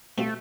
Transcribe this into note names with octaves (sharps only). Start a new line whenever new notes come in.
B2 G3 A3 C4 F4